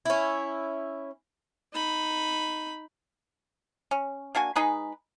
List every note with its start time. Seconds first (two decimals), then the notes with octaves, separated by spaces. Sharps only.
0.05 C#4 E4
1.74 D#4 B5
3.91 C#4
4.35 A#3 D4 F#4 G#5
4.56 G#3 D#4 G#4 B4